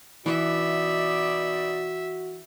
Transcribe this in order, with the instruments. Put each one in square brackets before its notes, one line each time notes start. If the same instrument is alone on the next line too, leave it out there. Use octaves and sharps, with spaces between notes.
[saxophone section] B2 D#4 D5 [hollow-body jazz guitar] E3 [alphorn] F#4 [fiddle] E5